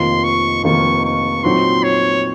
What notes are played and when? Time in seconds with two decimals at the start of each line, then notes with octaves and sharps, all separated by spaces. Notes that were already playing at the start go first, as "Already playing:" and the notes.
Already playing: F1 F2 D#3 A#3 F4 C6
0.24 C#6
0.63 F1 F2 D#3 A#3 F4 C#6
1.04 C#6
1.44 A#2 F#3 C4 D#4 C6
1.83 C#5